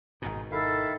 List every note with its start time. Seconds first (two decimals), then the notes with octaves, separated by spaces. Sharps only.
0.22 G#1 G#2 B2 D#4 G#4
0.52 D#3 E4 A4 E5 F5